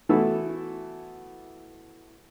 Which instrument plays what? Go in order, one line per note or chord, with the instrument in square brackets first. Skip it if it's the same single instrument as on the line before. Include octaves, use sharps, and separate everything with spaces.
[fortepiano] E3 A3 B3 E4 F#4 A4